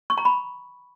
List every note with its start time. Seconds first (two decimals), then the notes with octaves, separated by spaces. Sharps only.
0.10 C#6
0.18 A#5
0.25 B5